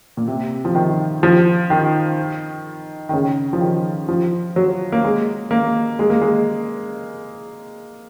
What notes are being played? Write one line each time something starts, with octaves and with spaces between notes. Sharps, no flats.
A#2
C3
F3
D#3
F3
D#3
D#3
C#3
F3
D#3
F3
F#3
A#3
G#3
A#3
G#3
A#3
G#3